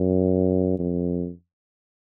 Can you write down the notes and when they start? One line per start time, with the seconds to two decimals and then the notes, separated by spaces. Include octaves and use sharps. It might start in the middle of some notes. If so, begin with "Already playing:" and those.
Already playing: F#2
0.79 F2